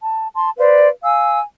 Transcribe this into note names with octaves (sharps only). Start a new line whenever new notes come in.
A5
A5 C6
B4 C5 D5 F5
F5 G#5 E6